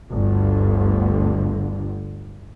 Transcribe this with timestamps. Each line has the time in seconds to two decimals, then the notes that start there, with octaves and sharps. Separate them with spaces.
0.11 G1 D2 G2 D3